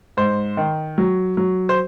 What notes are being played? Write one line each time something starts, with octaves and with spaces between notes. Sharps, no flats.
G#2 C5
D#3
F#3
F#3
C5